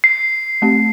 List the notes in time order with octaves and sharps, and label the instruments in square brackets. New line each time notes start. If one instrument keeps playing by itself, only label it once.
[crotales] C7
[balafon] A3 C4 G4